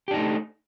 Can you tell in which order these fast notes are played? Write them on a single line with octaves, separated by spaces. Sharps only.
G4 D4 D#4 A3